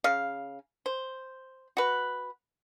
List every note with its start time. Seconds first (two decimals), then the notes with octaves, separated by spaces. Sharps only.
0.04 C#3 F5
0.86 C5
1.77 F#4 B4